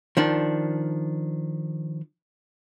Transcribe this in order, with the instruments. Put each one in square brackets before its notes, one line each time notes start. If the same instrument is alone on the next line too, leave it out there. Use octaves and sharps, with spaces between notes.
[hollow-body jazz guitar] D#3 F3 D4